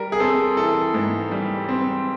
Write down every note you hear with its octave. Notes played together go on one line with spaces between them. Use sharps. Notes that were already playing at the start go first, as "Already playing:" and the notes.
Already playing: G3 A#4
G#4
C4 A4
E3 A4
G#2
G3
C4